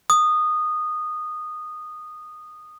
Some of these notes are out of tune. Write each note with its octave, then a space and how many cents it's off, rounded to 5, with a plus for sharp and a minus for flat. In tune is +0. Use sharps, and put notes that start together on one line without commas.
D#6 -15